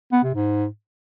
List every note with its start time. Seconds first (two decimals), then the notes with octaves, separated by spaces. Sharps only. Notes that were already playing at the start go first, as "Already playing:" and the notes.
0.12 B3
0.23 C3
0.34 G#2